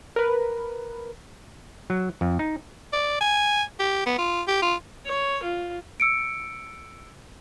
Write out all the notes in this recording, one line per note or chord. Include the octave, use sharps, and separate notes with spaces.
A#4 B4
F#3
F2
D#4
D5
G#5
G4
B3
F4
G4
F4
C#5
F4
E6 C#7 D7